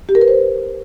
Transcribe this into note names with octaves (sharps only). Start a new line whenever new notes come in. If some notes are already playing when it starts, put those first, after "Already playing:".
G4
A#4
B4
C5